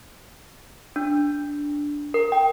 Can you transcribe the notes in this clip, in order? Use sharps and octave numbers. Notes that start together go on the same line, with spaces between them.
D4
A#4
G5